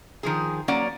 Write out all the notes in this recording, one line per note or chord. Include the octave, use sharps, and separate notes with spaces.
D#3 F3 G#4
F#3 A#3 C#4 D5 F#5